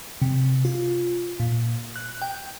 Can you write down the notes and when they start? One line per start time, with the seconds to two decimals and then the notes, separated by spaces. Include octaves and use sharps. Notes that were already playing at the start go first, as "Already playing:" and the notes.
0.22 C3
0.65 F4
1.40 A#2
1.96 F#6
2.22 G5